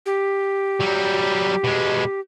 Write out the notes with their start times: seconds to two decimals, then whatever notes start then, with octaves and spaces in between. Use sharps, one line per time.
0.06 G4
0.81 F#3 G3
1.64 B2 G#3